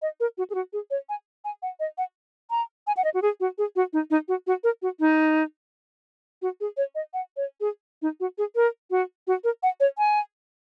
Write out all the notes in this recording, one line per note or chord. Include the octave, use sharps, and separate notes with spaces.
D#5
A#4
F#4
G#4
F#4
G#4
C#5
G#5
G#5
F#5
D#5
F#5
A#5
G#5
F#5
D#5
F#4
G#4
F#4
G#4
F#4
D#4
D#4
F#4
F#4
A#4
F#4
D#4
F#4
G#4
C#5
D#5
F#5
C#5
G#4
D#4
F#4
G#4
A#4
F#4
F#4
A#4
F#5
C#5
G#5